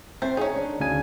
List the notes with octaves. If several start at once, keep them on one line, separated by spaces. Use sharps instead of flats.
A3 C4 C5
C#4 D#4 G#4
D#3 D4
D2 C#3 G#5